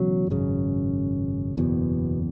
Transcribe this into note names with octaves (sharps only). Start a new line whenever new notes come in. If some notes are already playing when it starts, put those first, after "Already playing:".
Already playing: E1 E2 C#3 F#3
G#1 F#2 C#3
F#1 E2 B2